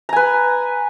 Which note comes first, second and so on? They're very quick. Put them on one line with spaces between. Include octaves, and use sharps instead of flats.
A#5 G#5 B4